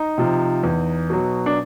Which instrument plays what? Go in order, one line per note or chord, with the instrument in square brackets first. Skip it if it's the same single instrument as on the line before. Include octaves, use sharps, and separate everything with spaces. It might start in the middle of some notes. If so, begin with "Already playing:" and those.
Already playing: [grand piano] D#4
C3 F3
E2
B2 F#3
D4